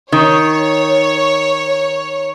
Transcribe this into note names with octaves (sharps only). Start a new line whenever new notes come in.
D#3 C#5